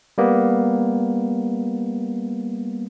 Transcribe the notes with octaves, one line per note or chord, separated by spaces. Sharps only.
G3 A#3 B3